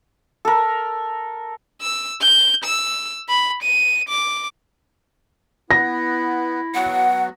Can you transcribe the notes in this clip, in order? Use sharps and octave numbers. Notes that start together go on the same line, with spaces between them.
A4 A#4
E6
G6
E6
B5
D#7
D6
B3 E4 A#6
F#3 B3 F#4 F#5